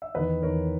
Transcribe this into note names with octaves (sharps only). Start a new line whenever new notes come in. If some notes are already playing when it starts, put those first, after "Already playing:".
E5
E2 D#3 B4 D#5
E2 D#3 A#4 C#5